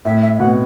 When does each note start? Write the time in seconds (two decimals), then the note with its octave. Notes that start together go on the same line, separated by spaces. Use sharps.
0.05 A2 E5
0.22 E5
0.35 E5
0.39 B2 F#5